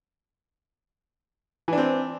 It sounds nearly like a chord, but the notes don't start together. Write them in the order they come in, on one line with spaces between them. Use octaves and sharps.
E3 D4 C4